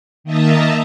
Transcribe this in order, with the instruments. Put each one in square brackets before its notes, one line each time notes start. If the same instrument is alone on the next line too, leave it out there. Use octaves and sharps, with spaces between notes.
[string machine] D#3 A#3 D#5 E5 A5 A#5